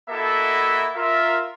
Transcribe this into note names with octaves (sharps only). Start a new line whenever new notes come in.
A#3 E4 F#4 A4 D#5 E5
F4 A#4 E5